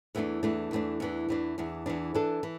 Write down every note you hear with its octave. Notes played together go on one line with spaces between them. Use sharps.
E2 E3 A3 D4
E2 E3 A3 D4
E2 E3 A3 D4
E2 E3 D4
E2 E3 D4
E2 E3 D4
E2 E3 D4
E3 D4 A4
E3